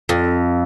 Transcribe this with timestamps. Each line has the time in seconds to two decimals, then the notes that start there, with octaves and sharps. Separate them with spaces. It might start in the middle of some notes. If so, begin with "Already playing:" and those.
0.09 F2